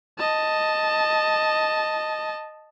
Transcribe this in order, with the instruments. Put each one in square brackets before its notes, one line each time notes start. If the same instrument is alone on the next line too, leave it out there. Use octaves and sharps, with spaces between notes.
[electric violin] D#5 A5